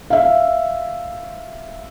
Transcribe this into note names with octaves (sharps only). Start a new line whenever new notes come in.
E5 F5